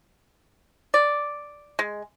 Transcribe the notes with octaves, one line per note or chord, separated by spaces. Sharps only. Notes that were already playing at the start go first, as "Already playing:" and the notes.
D5
G#3